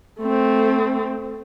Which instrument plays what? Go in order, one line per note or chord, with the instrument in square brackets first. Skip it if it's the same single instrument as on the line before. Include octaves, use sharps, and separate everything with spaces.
[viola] A3 C4